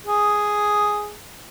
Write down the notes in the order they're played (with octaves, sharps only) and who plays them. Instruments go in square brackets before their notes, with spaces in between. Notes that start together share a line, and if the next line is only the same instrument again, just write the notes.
[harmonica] G#4